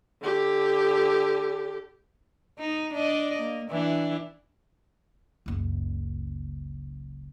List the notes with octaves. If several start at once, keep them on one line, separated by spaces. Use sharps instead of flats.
D3 G4
D#4
D4 D5 D#5
A#3
E3 D4 E4
F#1 C#2